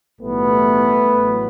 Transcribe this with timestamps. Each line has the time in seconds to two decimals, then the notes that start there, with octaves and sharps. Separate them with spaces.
0.21 B1 A2 E3 G3 A3 B3
1.15 A1 A2 F#3